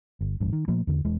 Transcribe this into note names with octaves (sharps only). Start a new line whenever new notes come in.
G1
E1 A1 G2
D#3
A#2 F3 A3 A#3
E2 D3
E1 E2 G#3